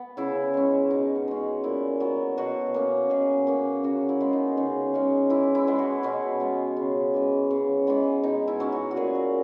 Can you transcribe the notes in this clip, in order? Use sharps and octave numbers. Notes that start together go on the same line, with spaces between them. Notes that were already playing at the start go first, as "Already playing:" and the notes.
Already playing: B3
C#3 E4
G#3 C#4
B2 D#4
C#4
G#3 C#4
A#2 E4
F#3 B3
B2 F#4
A#3 C#4
B2 G#4
A#3 C#4
C#3 F#4
E4
G#3 B3
D#4
C#3 D#4
G#3 C#4
E3 E4
E4
G#3 B3
F#4
B2 C#4
G#3 B3
C#3
E3 G#3
C#3
E3 G#3 B3
B2 D#4
E4
F#3 C#4
F#4
F#4
A#2 G#4
A#4